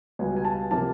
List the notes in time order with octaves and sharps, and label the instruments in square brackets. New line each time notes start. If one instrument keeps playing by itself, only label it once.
[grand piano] C#2 B2 G3 G#5
G#5
A5
C3 F3 A#3 A5